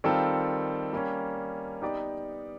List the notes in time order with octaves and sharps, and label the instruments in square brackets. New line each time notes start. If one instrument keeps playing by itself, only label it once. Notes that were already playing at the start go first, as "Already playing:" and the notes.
[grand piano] D#3 G3 C4 F4 A4
G3 A#3 C#4
B3 D#4 G4 B4 D5